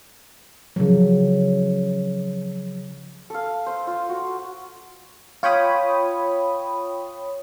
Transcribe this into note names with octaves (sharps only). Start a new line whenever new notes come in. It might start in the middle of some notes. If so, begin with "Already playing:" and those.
C#3 F3 F#3
A4 F5
C5
F4
F#4
F4 C#5 G5 B5 D#6